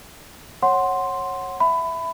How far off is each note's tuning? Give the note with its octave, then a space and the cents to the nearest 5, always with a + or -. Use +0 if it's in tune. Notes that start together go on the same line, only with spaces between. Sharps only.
C#5 -20 F#5 +0 C6 +0
E5 +0 B5 +20